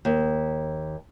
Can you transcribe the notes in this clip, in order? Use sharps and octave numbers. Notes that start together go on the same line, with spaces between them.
D#2